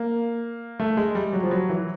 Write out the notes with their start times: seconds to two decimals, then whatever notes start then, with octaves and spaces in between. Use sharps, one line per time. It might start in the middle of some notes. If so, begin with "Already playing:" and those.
Already playing: A#3
0.80 A3
0.97 G#3
1.15 G3
1.33 F#3
1.43 F3
1.51 F#3
1.69 E3